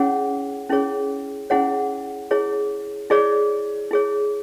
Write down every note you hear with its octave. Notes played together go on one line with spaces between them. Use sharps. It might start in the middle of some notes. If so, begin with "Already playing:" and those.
Already playing: C#4 E4 G#4 C#5 F#5
C#4 E4 G#4 C#5
C#4 E4 G#4 C#5 F#5
E4 G#4 C#5
E4 G#4 C#5 D5
E4 G#4 C#5